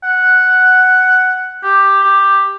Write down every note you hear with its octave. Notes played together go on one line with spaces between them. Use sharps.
F#5
G4
G4